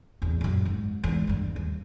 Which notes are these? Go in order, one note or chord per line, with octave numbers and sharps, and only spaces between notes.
D1 E2
A#1 F#2
G#2
E2 G#2
E2 G2
D#2